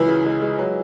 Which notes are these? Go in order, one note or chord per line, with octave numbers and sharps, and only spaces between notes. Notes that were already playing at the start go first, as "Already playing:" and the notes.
Already playing: C#2 E3 F#3 E4
C#3
G#3
G#3
F#3